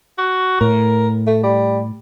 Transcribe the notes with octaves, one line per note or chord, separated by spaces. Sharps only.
F#4
A2 A#4
A3
G3